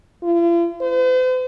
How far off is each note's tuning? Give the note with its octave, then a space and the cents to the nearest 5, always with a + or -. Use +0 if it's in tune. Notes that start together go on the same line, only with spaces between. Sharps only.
F4 -45
C5 -45